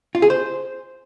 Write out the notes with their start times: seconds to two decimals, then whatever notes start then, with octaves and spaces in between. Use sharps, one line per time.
0.15 F4
0.22 G#4
0.30 C5